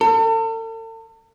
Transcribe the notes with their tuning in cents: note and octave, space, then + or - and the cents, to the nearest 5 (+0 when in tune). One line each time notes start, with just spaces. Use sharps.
A4 +40